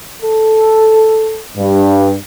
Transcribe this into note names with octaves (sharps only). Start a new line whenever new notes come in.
A4
G2